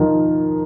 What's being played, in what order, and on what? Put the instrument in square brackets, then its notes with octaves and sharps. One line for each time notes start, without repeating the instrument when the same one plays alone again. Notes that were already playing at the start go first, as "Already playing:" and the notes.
Already playing: [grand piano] D#3 F3